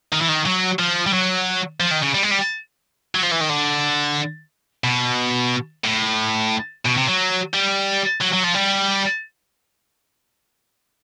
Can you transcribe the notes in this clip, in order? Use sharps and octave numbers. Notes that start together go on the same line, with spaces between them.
D#3
E3
D#3
F#3
F3
G3
F#3
F3
D#3
C#3
G3
G#3
G3
F#3
F3
E3
D#3
D3
B2
A2
B2
C3
F#3
G3
F#3
F#3
F3
G3